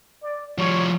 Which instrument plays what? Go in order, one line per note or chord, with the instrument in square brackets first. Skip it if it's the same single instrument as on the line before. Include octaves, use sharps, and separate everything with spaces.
[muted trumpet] D5
[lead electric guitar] F3 G3 [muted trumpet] C#5